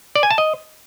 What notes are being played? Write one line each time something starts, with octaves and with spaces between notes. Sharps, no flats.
D5
G#5
A5
D#5